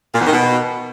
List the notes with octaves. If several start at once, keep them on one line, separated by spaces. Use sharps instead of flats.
A#2
E2
D#3
B2